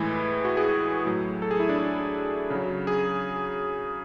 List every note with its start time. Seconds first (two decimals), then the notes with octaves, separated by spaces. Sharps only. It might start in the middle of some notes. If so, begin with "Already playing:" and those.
Already playing: A2 E3 G#3 E4
0.45 F#4
0.57 G#4
1.05 A2 F#3
1.42 A4
1.51 G#4
1.60 E4
1.69 D4
1.79 E4
2.50 C#3 F#3
2.87 G#4